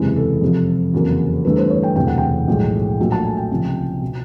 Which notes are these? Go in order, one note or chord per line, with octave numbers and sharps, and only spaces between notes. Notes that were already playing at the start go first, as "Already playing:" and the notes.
Already playing: F#1 E2 C3 E3 G#3 G#4
A4
F2 C3 F3
F1 E2 C#3 F#3 A#3
G1 G2 E3 A3 B4
C5
C#5
G5
E1 D2 C3 E3 A3 G5
F#5
G5
B1 A2 F3 G#3
A#1 A#2 F#3 A3
A5
G#5
G5
C#2 C3 F3
B2